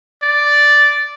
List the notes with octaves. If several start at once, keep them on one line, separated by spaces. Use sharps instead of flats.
D5